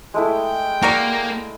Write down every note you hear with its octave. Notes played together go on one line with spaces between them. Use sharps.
G#3 A3 E4 G5
A#3 F#4 A#4 D5